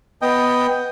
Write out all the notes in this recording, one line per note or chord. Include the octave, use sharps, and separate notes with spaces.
B3 D#5 G5